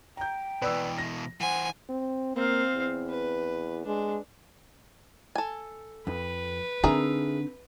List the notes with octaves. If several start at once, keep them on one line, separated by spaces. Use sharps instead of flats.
G5 A#5 G6
B2 E3 B4 D5 E6
A#6
E3 C5 F#5 G#5
C4
A#3 C4 F5
E2
B4
G#3 D4
A4 G#5
F2 B4
D3 C4 D#4 G#4 A#4 E5